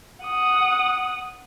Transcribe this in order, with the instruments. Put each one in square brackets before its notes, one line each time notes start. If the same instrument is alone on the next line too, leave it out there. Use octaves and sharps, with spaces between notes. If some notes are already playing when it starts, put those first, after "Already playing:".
[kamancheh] F#5 D#6